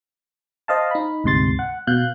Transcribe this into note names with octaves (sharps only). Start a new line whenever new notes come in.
C5 D#5 F5 A5
D#4 B5
D2 G#2 C3 C6 A6
F#5
B2 F5 F#6 G6